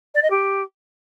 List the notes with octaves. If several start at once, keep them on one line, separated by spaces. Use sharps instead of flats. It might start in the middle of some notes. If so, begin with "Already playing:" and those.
D5
D#5
G4